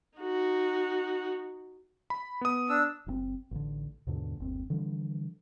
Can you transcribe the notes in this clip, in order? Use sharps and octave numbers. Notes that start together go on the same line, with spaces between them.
D#4 F#4
B5
B3 D#6
D4 E6
F#1 C#3 C4
A1 D3
D#2 G#2 B2 D3
G1 D#2 C4
D3 E3 F3 G3